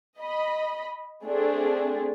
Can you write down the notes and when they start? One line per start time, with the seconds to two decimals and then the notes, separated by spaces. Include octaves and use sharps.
0.18 D#5 B5
1.25 A3 C4 D4 G#4